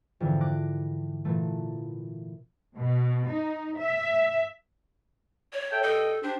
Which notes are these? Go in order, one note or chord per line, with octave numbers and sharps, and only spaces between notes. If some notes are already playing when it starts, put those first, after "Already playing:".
F2 G#2 D3 E3
D6 F#6 A#6
A#2 E3 A3
B2
D#4
E5
C#5
A4 E5 G5
G2 A4 D#5 G5
D4 G4 C5